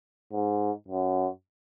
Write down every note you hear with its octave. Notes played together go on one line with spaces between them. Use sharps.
G#2
F#2